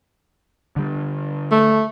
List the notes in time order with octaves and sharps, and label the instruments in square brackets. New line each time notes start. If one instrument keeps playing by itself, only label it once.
[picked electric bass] D3 G3
[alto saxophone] A3